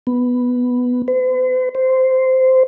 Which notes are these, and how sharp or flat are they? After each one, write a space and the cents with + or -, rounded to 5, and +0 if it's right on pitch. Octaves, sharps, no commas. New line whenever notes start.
B3 +0
C5 -45
C5 -10